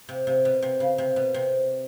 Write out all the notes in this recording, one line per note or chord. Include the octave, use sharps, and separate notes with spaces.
C3
C3
B2
C3
C#3
C3
B2
C3